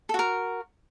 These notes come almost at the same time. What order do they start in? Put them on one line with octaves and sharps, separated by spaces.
A4 F#4 A#4